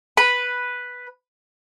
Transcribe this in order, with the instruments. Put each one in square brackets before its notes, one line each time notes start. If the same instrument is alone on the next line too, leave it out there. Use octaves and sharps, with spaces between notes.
[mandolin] B4 B5